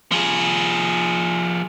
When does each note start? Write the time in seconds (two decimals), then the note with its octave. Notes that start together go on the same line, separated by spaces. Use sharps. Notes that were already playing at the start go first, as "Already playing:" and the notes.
0.12 F3 G#4